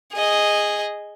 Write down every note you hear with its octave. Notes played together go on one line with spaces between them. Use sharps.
G#4 D#5